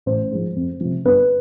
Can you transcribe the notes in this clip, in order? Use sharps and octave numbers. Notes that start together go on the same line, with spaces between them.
A1 C5
G#2 F3
F2
C3 F3
G1 B4